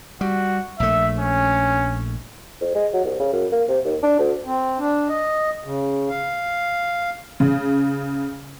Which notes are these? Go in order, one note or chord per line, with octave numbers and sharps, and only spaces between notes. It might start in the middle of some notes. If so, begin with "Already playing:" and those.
G3 F#4
A#1 A3 E5
C#4
F2
G#3
F#3
C2
C#3
F#2
A#3
C3
D#2
D4
D2
C4
D4
D#5
C#3
F5
C#3